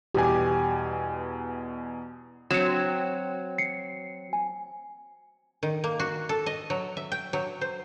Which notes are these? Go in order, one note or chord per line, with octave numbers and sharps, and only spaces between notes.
E2 B2 G4 G#5
F#3 C4 C#7 E7
C7 C#7
G#5
D#3
A#3
F#4
A4
D#5
F#3
E5
G5
F#3
C5